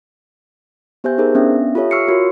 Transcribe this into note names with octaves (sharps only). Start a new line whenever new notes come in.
B3 G4 C5 E5 G#5 G6
D#4 G#4 A#4 C5
B3 C#4 D4 E5
F4 G4 A4 C#5 E5
C#6 E6 F6 C7 C#7
F4 F#4 A#4 C#5